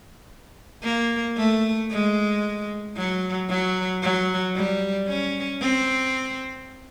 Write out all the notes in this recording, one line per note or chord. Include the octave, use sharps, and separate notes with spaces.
A#3
A3
G#3
F#3
F#3
F#3
G3
C#4
C4